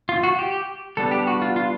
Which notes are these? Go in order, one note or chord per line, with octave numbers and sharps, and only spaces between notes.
F4
F#4
G4
G3 B3 D4 A4
G4
F#4
F4
F4